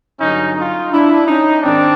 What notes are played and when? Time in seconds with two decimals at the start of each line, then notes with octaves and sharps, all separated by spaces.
0.20 G2 D3 F#3 C#4 D#4
0.56 D#4 F4
0.92 D4 E4
1.27 C#4 D#4
1.62 G#2 D#3 C4 D4